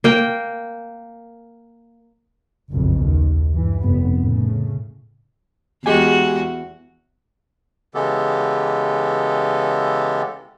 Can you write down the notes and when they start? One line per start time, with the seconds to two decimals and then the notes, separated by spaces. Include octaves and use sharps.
0.04 A#3 G5
2.72 F#1 B1 F2 B2
3.05 D#2
3.51 G2 E3
3.84 F1 B3
4.19 A2 C#3
5.86 E2 G#3 F#4 G4 G#5
7.95 C#3 E3 G#3 B3 G4 A4